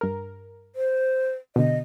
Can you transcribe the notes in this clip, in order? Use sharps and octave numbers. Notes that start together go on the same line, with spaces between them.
G2 A#4
C5
B2 D3 D#5